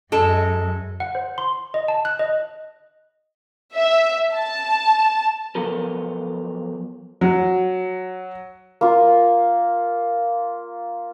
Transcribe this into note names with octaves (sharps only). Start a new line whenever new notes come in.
F#2 F#3 G#3 A4
F#5
C5
C6
D#5
A5
F#6
D#5
E5
A5
F3 F#3 B3 A4 A#4
F#3
A#3 F4